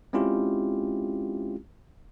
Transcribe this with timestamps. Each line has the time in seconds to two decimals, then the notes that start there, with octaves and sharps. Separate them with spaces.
0.13 G#3 C4 C#4 E4 F4 G4